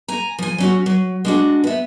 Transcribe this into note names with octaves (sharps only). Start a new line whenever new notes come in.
G#5 A#5
F3 G#5
F#3 C#4 F#4
F#3
G#3 D4 F#4
B3 E5